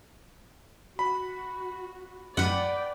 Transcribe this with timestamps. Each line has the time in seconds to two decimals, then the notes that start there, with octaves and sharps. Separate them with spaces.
0.99 F#4 B5
2.37 F#2 A2 B4 D5 F#5 G5